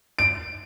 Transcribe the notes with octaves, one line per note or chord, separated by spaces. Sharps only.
D7